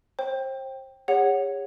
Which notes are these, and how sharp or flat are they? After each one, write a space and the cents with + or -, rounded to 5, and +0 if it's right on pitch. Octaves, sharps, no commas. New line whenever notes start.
C5 +30 G5 +0
G#4 -45 C#5 +0 F#5 +0